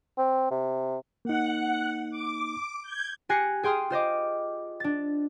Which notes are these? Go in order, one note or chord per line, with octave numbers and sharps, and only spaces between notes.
C4
C3
A#3 D#4 F#5
D6
G6 G#6
G4 G#5 F#6 A#6 C7 C#7
G#4 G5 C6 D#6 F6
F4 C5 D#5 D6
D4 A6